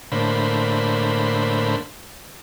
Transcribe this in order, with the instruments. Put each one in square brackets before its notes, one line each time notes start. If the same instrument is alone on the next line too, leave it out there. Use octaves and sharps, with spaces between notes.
[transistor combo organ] A2 D3 A#3 C5 B5